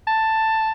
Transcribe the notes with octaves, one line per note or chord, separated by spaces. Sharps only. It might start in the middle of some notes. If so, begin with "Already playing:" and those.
A5